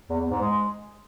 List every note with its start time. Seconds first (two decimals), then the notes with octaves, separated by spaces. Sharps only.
0.10 E2
0.20 E2
0.30 G#2
0.41 G#3